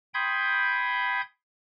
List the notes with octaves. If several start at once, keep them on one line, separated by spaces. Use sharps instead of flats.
G5 B5 C6 D#6 G6 G#6